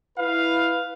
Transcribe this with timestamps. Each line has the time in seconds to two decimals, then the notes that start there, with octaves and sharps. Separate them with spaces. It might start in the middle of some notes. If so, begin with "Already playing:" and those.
0.19 E4 B4 F5